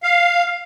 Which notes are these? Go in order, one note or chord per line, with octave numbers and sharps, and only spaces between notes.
F5